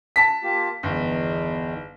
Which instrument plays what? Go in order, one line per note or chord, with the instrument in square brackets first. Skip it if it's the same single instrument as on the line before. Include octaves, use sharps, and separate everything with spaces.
[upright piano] A5 B6
[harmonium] A#3 F4 G4
[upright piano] G1 [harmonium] E2 D#3